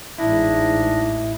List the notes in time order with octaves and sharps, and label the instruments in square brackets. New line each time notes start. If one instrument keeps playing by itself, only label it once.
[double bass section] A1 [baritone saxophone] G#2 [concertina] D4 D#5 [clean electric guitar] E4